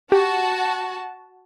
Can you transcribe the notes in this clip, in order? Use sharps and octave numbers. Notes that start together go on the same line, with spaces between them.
F#4 G4 A5